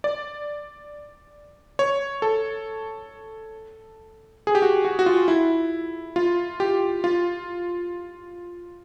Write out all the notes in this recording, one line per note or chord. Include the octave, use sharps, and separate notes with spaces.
D5
C#5
A4
G#4
G4
F#4
F#4
F#4
F4
E4
F4
G4
F4